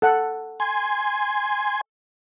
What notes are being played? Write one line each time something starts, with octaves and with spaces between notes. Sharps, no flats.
A4 F#5
G#5 C6 G#6